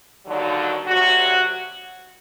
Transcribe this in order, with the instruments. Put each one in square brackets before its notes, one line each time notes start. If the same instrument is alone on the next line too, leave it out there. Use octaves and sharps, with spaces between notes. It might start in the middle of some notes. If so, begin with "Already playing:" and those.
[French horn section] D#2 D3 F#3
D2 C3 F#3 F#4